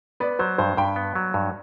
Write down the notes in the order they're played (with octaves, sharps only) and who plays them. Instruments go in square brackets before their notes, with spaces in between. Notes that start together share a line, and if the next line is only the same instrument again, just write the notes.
[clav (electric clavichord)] B3 [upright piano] B4 D5
[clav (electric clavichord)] F#3 [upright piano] C5
[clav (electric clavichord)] G2 [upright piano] C5
[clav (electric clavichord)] G2 [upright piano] G5 B5
[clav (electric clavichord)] B3
F#3
G2